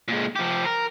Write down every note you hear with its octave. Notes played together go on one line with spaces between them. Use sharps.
A#2 G#3
F3 G4
A#4